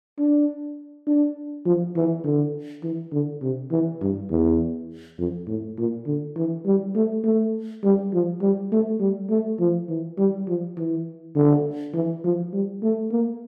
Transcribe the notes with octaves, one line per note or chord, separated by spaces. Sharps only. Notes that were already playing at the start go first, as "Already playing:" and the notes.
D4
D4
F3
E3
D3
E3
D3
C3
E3
G2
E2
F2
A2
A#2
D3
E3
G3
A3
A3
G3
F3
G3
A3
G3
A3
F3
E3
G3
F3
E3
D3
E3
F3
G3
A3
A#3